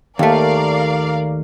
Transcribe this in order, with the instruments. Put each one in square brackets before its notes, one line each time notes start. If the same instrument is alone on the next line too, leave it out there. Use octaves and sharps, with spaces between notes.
[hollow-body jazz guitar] D#2 A3 [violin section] A#4 D5 F5